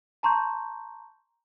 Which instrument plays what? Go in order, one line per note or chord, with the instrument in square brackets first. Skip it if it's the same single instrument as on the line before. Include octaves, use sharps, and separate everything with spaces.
[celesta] A5 A#5 C6 C#6 G6